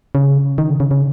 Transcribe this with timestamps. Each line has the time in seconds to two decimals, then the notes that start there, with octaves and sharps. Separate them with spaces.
0.15 C#3
0.58 D#3
0.70 C#3
0.80 C#3
0.91 C#3